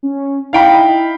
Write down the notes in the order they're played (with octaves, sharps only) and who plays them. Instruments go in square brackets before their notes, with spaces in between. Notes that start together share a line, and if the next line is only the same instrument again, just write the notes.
[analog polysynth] C#4
[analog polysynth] D#4 E4 [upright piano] F5 G5 B5